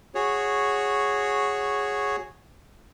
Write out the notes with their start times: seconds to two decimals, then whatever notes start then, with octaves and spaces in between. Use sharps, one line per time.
0.15 F#4 G#4 C#5